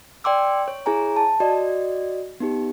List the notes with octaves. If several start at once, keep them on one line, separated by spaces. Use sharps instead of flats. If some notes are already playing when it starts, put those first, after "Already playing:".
D5 G5 C6 D6 E6
C#5
E4 G#4 C#5 G#5 A#5
A5
F#4 D5 D#5
B3 D#4 G4